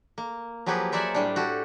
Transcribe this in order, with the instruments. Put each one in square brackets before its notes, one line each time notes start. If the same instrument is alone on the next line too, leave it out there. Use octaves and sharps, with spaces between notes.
[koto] A#3
F3 F#3 A#3 G4 G#4 B4
A#4 C5 D5 E5 F#5 G#5
A2 G3 D4
F#4 G4 A4